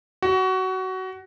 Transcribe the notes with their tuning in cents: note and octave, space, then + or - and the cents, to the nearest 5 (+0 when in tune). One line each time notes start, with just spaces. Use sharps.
F#4 +20